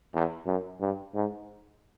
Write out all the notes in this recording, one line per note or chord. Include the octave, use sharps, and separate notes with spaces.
E2
F#2
G2
G#2